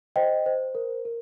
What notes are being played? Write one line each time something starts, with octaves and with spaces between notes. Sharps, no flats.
C5 D#5 G5
C5
A#4
A#4